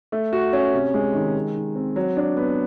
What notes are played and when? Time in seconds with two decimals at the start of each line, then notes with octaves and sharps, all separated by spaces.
0.12 A3
0.33 F#4
0.53 C#4
0.74 C3
0.94 G#3
1.14 D#3
1.35 G#3
1.55 D#4
1.75 C4
1.96 F#3
2.17 D4
2.37 B3